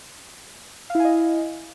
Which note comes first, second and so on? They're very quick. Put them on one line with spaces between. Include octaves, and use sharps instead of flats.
F5 E4 G#5 D#5